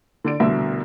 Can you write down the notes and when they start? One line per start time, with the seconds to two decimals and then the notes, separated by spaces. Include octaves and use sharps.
0.24 D3 D5 D7
0.40 C2 B2 D3 A3 E5